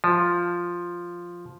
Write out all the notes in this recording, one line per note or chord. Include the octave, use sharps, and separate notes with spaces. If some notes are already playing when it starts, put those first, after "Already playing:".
F3